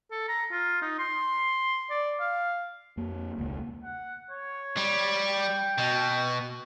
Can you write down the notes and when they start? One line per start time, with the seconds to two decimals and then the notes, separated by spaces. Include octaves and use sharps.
0.11 A4
0.28 A#5
0.51 F4
0.82 D#4
0.99 C6
1.90 D5
2.20 F5
2.97 F2 A#3
3.36 E1 C#2 A#3
3.84 F#5
4.31 C#5
4.77 G3
5.28 G5
5.78 B2